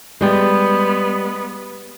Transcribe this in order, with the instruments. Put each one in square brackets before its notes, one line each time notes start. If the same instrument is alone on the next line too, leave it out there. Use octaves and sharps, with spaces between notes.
[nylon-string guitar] G3 G#3 [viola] B3